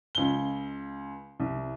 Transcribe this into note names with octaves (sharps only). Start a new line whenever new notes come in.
C#2 G7
C2